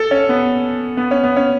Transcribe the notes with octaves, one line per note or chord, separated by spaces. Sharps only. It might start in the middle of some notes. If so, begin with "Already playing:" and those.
Already playing: A4
C#4
B3
B3
C#4
B3
C#4